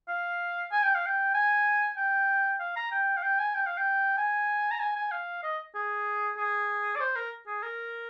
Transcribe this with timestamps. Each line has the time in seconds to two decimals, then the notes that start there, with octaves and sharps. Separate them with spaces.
0.09 F5
0.72 G#5
0.83 G5
0.95 F5
1.06 G5
1.35 G#5
1.97 G5
2.60 F5
2.76 A#5
2.92 G5
3.17 F5
3.23 G5
3.39 G#5
3.55 G5
3.66 F5
3.78 G5
4.18 G#5
4.71 A#5
4.80 G#5
4.96 G#5
5.11 F5
5.43 D#5
5.75 G#4
6.37 G#4
6.96 D5
7.00 C5
7.16 A#4
7.47 G#4
7.63 A#4